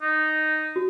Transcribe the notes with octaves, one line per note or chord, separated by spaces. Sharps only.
D#4
F#4